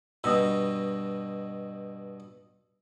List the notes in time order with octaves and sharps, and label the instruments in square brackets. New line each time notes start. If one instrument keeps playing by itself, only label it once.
[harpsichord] G2 B2 [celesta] D#6 E6